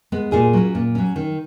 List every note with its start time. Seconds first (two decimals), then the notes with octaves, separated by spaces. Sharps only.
0.12 G#3 B3
0.32 A#2 F4 G#4
0.53 F#3 C#4
0.75 A#2
0.95 F#3 C#4
1.16 D#3